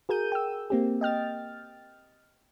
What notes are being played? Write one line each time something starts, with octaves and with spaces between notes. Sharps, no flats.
F#4 G#4 A#4 G6 D#7
G5 E6
A#3 C4 G4
D#5 G5 F6 A6